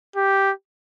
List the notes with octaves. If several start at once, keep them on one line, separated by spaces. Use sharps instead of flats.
G4